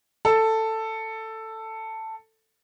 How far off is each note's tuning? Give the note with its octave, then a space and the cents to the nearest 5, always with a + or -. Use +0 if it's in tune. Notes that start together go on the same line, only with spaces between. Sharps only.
A4 +10